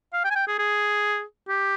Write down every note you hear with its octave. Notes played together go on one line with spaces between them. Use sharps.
F5
G5
G#5
G5
G#4
G#4
G4